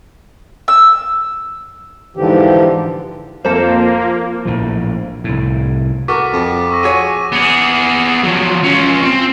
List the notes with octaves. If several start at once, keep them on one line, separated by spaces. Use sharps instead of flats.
E6
G#2 D3 E3 F3 G4
F2 A#3 F4 A4 C5
A#1 A2 F3
C2 A2
F#4 A4 A#4 D6 B6 D#7
F2
C#6 E6 A#6
F#4 G#4 C#5 D#7
B3 G#4
F3 F#3
C#4 F4
C4